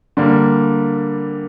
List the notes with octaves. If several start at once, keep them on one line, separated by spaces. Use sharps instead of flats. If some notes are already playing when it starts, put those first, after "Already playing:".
D3 G3 A#3